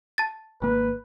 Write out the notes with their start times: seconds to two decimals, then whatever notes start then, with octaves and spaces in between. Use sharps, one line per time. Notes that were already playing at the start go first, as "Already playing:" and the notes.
0.18 A5 A6
0.62 G#1 A#3 B4